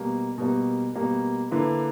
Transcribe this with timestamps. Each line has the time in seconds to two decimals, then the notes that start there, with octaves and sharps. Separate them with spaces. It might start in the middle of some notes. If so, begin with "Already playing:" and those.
Already playing: B2 G3 A#3
0.38 B2 G3 A#3
0.95 B2 G3 A#3
1.51 D3 A#3 E4 B4